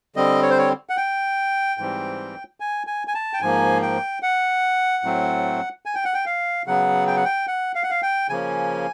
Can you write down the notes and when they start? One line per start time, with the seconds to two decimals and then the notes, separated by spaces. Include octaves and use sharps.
0.16 D3 G3 C4 D#5
0.42 C#5
0.50 C5
0.58 C#5
0.90 F#5
0.97 G5
1.78 G#2 E3 G3 C4
2.60 G#5
2.87 G#5
3.08 G#5
3.15 A5
3.33 G5
3.41 G#2 F3 A#3 G#5
3.82 G5
4.23 F#5
5.04 A2 F#3 A3 C4
5.86 G#5
5.95 G5
6.05 F#5
6.14 G5
6.26 F5
6.67 C#3 F#3 B3 F#5
7.07 G5
7.16 F#5
7.25 G5
7.48 F#5
7.75 F5
7.83 F#5
7.91 F5
8.03 G5
8.29 C#3 F3 A#3 C#4 G#5